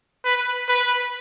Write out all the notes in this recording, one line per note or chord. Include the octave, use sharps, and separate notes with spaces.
B4
B4